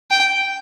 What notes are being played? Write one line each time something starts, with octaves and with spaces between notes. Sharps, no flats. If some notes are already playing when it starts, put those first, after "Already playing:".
G5